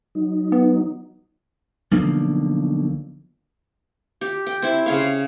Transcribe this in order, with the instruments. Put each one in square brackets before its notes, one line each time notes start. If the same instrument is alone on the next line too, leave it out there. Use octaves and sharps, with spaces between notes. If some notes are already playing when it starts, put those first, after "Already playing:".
[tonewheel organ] F#3 D#4
[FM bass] B3
[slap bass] B1 D3 F3 A#3
[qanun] G4
G5
C4 E4
C#3 C#5 F5